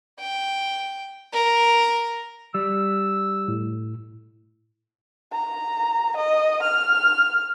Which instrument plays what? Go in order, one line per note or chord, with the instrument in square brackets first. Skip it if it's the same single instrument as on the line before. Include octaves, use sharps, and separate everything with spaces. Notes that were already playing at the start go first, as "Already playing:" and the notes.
[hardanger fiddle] G5
A#4
[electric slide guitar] G3 [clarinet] E6
[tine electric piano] A2
[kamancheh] A#5
D#5
F6